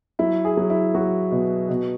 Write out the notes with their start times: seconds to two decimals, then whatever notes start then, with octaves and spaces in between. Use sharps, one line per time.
0.19 F#3 E4
0.45 G#4
0.57 F#3
0.70 E4
0.95 F#3 F#4
1.31 B2
1.69 B2